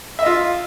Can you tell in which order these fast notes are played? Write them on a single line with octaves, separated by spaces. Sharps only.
E5 D#5 F4